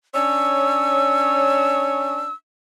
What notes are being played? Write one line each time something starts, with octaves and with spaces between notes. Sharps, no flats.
C#4 D4 C#5 E6